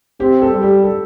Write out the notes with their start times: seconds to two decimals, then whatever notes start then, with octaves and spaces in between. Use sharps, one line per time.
0.20 C4 G4
0.42 A4
0.52 G3
0.63 G4
0.84 A4